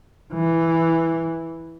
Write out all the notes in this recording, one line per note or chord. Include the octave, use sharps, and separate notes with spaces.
E3